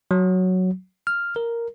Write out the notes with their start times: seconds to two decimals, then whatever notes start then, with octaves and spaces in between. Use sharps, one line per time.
0.11 F#3
1.07 F6
1.36 A#4